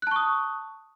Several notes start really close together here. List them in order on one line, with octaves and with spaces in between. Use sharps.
F#6 A5 C#6 D#6